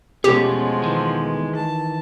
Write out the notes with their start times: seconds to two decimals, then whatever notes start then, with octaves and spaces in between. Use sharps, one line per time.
0.24 E2 B2 F3 G#3 A3 C#4 G4
0.83 D#3 E3
1.55 A5